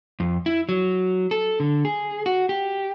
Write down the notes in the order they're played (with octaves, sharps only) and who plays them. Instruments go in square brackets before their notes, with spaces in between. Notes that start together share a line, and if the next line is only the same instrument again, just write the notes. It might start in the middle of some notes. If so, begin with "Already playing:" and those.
[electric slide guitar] F2
E4
F#3
A4
D3
G#4
F#4
G4